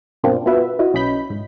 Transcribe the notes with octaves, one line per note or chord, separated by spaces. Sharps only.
G2 B2 A#3 C4 D4 F4
B3 F4 F#4 B4 E5
E4 F#4 D#5
B1 C#4 D#5 B5 G6 B6
G#2